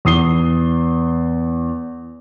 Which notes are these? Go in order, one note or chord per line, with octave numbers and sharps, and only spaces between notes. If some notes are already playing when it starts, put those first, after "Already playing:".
E2 D#6 C7 G7